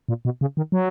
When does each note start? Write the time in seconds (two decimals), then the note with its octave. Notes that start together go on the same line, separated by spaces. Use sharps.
0.09 A#2
0.25 B2
0.41 C#3
0.57 D#3
0.72 F#3